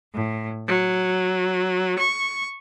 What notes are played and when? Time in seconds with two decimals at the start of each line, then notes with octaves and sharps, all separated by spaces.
0.13 A2
0.66 F#3
1.98 C#6